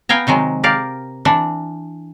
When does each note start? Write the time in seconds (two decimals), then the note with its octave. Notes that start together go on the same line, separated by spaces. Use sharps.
0.09 B3 F5 G5 G#5 A#5
0.27 C3 D#3 F#3 G#3
0.63 G4 A#4 D5 F5
1.25 E3 D4